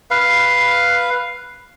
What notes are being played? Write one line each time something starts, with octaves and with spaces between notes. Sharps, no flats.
B4 F5